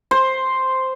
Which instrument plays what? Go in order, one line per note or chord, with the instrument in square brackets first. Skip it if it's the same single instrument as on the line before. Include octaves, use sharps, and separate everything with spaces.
[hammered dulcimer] C5